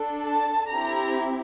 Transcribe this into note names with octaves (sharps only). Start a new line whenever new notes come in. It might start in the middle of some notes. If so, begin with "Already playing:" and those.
Already playing: D4 A4
A5
C4 E4 G4 A#5